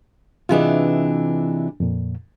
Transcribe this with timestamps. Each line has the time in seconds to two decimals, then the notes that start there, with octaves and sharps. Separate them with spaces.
0.49 C3 E3 D4 F4 G#4 D#5
1.80 F2 A#2